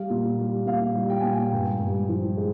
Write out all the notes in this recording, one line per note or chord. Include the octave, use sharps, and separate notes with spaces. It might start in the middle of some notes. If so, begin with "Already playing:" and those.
Already playing: G3 F5
A#2
G3
A#2 F5
G3
G5
A#2 G#5
G5
G2
G2
F3
G#3